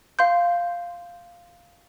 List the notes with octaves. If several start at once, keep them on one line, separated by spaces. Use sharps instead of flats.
F5 C6 G6